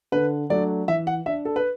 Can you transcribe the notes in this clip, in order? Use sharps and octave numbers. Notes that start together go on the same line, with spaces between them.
D3 B4
F#3 A3 D4 D5
E3 E5
F#5
D4 E5
A4
B4